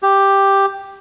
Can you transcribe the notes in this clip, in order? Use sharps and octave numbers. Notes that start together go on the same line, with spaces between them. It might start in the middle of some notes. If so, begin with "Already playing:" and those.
G4